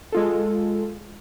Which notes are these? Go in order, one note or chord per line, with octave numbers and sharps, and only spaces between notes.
G#3 F4 A4